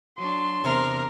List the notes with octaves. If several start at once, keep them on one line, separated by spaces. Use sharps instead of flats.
F#3 D4 C6
E2 C3 A#4